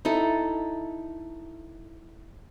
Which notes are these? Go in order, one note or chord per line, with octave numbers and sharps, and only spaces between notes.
D#4 E4 A4